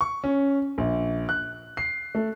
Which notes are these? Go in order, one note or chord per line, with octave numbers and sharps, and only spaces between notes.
C#6
C#4
A#1
F#6
C7
A3